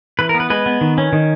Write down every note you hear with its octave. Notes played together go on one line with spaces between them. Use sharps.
E3 B4
A#4
B3
B4
G#3 B4
B3
D#3
C#4
D#3